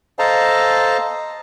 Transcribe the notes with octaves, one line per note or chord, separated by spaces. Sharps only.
A4 C5 D#5 F5 A5 A#5